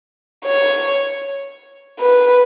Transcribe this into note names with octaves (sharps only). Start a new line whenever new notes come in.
C#5
B4